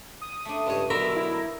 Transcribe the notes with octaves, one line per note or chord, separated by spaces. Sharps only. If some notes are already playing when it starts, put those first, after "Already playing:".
D#6
A3 D4
C#2 G2 C#5
B1 D3 A#4 E5 B5
E4